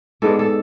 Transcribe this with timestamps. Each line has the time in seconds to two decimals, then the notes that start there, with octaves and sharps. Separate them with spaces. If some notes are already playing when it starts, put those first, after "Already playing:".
0.22 G#2 G#3 B3 D4 A4
0.39 A4